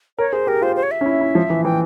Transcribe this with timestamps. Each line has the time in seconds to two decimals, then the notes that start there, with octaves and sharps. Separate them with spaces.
0.18 A#4 C#5
0.33 G#4 C5
0.47 G4 A#4
0.62 F4 C5
0.76 C5
0.83 C#5
0.91 E5
1.01 C#4
1.06 E4
1.21 E4
1.35 F3
1.50 E3
1.64 E3 G5